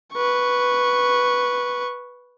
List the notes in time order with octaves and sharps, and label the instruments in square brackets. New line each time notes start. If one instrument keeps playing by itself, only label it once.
[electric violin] B4 C#6